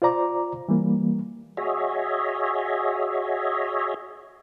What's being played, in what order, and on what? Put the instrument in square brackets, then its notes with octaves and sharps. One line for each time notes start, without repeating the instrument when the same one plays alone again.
[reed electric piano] F4 C5 D5 A#5 D6
E3 G3 A#3
[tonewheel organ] F#4 G#4 C#5 D#5 E5